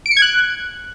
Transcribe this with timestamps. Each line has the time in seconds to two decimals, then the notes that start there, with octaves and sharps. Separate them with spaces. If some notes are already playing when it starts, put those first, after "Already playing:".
0.06 D7
0.11 C#7
0.17 G#6
0.22 F#6